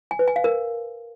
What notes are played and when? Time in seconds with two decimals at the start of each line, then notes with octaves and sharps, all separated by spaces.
0.11 G#5
0.19 B4
0.28 G#5
0.36 F5
0.44 A#4